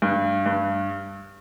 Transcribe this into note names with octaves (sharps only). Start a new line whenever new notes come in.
G2
G2